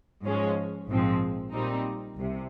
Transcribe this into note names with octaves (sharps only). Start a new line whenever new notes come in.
G#2 F3 G#3 C#4
A#1 G#2 F3 G#3 C4
A#2 G3 C4 D#4
C2 C3